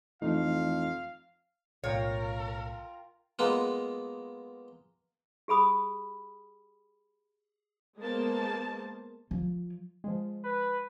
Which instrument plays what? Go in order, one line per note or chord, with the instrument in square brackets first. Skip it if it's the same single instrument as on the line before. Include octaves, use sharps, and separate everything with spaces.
[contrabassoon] F2 [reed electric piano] E3 A3 D#4 [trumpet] F5
[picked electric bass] B1 A2 [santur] F4 F5 G5 [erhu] A#4 [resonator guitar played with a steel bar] C#5
[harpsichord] G#3 A#3 B3 F4
[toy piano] G4 G#4 B5 D#6
[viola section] G#3 A#3 B3 A#4 C5 A5
[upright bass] F3
[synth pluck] F3 G#3
[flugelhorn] B4